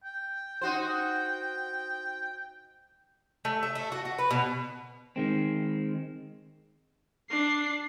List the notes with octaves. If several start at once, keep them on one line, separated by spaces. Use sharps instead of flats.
G5
D#4 F#4 C5 G5
A3
E5
A3
F#4
F#4
B4
B2
D#3 G#3 C4
D4 C7